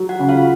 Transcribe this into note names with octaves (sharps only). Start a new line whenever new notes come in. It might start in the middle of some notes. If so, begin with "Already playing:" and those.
Already playing: F#3
F#4 F#5
C#3
F4 F5